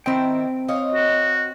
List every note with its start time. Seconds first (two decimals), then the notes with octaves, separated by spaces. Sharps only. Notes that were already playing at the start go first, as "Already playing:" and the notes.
0.06 D#3 C4 E4 G5
0.68 C#5 D#5 F5
0.94 F#4